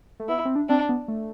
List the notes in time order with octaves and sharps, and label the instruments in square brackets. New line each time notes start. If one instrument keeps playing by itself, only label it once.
[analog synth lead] A3
[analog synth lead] B3 [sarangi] E4
[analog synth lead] C4
D4
[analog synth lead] C4 [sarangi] D4
[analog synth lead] B3
A3